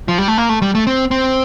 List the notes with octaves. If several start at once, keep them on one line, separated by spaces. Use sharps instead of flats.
F3
G3
A3
A#3
A3
G3
A3
C4
C4